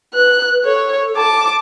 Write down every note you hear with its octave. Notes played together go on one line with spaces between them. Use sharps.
B4 F#6
A4 C#5
A5 D6